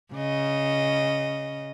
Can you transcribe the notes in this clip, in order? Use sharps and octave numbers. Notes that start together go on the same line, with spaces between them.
C#3 D#5